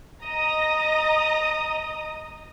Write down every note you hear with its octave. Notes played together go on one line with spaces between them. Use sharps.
D#5 A#5 D#6 A#6